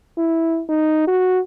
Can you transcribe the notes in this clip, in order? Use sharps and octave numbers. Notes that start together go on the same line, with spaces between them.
E4
D#4
F#4